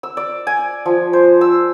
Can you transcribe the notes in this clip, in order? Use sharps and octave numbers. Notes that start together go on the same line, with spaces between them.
E6
D5
G#5
F3
C5
E6